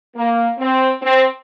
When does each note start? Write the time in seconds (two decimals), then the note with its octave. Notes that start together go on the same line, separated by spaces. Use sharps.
0.16 A#3
0.59 C4
1.02 C4